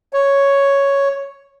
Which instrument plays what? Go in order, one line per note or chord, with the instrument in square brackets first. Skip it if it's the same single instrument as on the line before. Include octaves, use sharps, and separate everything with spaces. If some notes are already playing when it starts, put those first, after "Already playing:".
[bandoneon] C#5